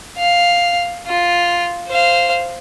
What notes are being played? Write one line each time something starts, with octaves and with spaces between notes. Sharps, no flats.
F5
F4
C5 F5